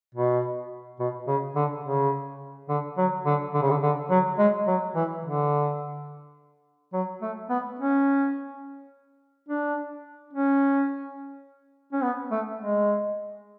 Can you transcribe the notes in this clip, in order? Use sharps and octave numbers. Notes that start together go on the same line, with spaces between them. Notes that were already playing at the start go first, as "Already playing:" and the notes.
B2
B2
C#3
D3
C#3
D3
F#3
D3
D3
C#3
D3
D3
F#3
G#3
F#3
E3
D3
F#3
A3
B3
C#4
D4
C#4
C#4
B3
A3
G#3